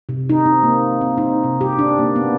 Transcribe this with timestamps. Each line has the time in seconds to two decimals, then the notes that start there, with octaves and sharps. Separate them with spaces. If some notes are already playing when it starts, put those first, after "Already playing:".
0.09 C3
0.29 D#4
0.46 C4
0.63 A#3
1.01 C4
1.18 D#4
1.44 C3
1.61 G4
1.79 D4
1.99 A#3
2.16 B3